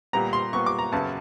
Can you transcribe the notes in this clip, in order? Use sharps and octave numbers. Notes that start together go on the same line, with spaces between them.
A#2 G3 B3 A#5
C6
A#2 G3 B3 C#6
D6
A#5
F#2 C#3 F#3 B3 A5